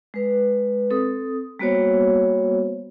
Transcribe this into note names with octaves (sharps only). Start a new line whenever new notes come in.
G#3 B4
C4 A4 D#6
G3 A#3 B3 F#4 C5 C#5